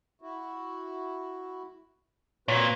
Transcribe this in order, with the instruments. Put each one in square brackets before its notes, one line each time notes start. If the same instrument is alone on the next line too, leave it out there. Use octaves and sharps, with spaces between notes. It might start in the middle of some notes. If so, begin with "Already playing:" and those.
[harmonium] E4 F#4
[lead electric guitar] A#2 [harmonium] C4 F#4 B4 [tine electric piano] C#5